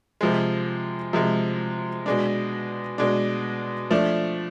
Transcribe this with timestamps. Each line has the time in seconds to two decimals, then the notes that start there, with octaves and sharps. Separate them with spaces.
0.21 C3 F3 G#3
1.13 C3 F3 G#3
2.06 B2 G#3 D4
2.98 B2 G#3 D4
3.91 F3 A3 D4